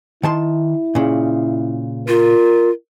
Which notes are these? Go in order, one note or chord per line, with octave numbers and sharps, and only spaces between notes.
D#3 E4 A5 C6
A#2 C#3
F4 A#4